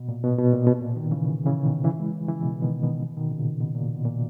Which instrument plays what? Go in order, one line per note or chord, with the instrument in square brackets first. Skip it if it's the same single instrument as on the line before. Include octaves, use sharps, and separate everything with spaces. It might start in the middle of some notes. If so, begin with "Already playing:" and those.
Already playing: [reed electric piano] B2
A#2
B2
B2
A#2
B2
A#2
B2 D#3
C#3 E3
C#3 E3
B2 D#3
C#3 E3
E3 G#3
C#3 E3
B2
B2 D#3
B2 D#3
B2 D#3
A#2 C#3
B2
A#2
B2
A#2